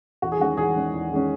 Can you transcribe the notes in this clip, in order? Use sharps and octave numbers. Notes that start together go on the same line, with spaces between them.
E2 F#4
G#4
D#3 G#3 C#4 F#4
E2 G#4
D#3 G#3 C#4
E2
D#3 G#3 C#4